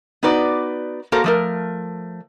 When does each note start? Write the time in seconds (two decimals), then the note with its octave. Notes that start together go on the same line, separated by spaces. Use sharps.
0.23 B3 D#4 F#4 B4 D5
1.12 A#3 F#4 A4 A#4 C5
1.24 F3 A3 A#4